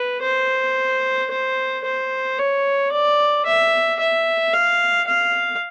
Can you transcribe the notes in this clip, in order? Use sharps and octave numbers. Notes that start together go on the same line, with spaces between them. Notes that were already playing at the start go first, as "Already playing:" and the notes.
Already playing: B4
C5
C5
C5
C#5
D5
E5
E5
F5
F5